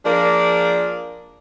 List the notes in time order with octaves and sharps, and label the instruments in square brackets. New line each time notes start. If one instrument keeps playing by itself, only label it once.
[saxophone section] F3 A#3 D4 G#4 A#4 D5